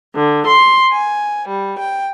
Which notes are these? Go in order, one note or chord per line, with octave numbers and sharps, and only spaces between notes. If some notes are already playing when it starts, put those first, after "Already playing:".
D3
C6
G#5
G3
G5